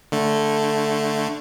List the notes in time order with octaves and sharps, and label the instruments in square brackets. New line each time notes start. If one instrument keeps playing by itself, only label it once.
[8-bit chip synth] D3 A3